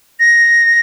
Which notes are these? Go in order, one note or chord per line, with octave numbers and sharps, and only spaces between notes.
A#6